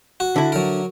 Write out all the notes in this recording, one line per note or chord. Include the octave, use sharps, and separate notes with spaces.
F#4
D3 E4
F#3 A#4